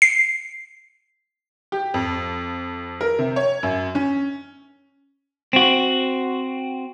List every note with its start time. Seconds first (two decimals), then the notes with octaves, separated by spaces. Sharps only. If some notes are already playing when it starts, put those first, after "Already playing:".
0.02 C7
1.72 G4
1.94 F2
3.01 A#4
3.19 C3
3.36 C#5
3.63 F#2
3.95 C#4
5.53 C4 F#4